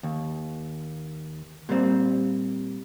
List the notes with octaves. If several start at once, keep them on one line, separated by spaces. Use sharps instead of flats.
D#2
A#2 G3 C4